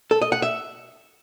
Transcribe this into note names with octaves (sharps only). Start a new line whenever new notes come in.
A4
D#5
F#5
E5